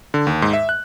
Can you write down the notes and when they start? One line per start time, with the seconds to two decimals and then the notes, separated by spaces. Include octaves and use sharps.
0.14 D3
0.27 D#2
0.42 G#2
0.53 E5
0.69 F#6